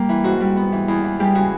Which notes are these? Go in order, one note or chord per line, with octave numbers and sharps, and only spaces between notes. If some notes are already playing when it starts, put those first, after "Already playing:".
Already playing: G3 A#3 G4
E3
G#2 F#4
G3
B3
E3
E2
E3
G3 G#3 G4
C#3 F#4